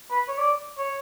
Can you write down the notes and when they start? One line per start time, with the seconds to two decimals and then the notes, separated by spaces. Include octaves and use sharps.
0.11 B4
0.28 C#5
0.38 D5
0.78 C#5